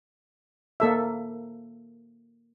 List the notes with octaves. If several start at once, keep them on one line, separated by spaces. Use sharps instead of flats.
A#3 A4 E5